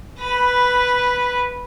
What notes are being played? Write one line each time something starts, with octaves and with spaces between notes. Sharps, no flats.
B4 B5